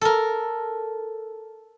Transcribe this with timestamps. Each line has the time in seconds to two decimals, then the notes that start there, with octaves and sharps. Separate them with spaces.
0.01 A4 A#4